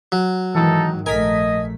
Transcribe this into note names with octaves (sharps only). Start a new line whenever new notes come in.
F#3
G#2 D#3 E3 D#4 A4
A#1 A3 A#4 D#5 G#5 B6